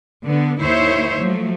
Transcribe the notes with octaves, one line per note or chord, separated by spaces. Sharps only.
D3 B3
D#2 D#3 E4 C5 C#5 E5
F3 F#3 A3